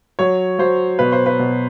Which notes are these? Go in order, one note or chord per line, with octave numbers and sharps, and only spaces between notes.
F#3 C#5
F#3 C5
B2 B4
C5
B4
B2